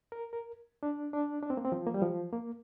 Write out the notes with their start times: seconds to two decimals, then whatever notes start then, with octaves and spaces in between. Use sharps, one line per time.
0.12 A#4
0.33 A#4
0.83 D4
1.13 D4
1.43 D4
1.50 C4
1.57 A#3
1.64 C4
1.72 F3
1.87 A#3
1.94 G3
2.02 F3
2.33 A#3